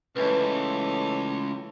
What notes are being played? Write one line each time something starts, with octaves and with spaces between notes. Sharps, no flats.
C#2 E3 A3 B4 C#5 D#5 G#5